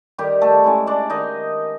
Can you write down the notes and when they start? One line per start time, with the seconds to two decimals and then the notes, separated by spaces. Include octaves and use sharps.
0.18 D#3 G3 G4
0.42 A3 A4
0.64 G#3 C#4 E4
0.87 D4 D5
1.10 D#3 D#4 D#5